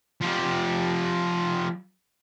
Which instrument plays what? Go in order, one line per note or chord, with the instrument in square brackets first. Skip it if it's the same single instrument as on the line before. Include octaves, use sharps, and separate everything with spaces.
[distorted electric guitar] F3 G4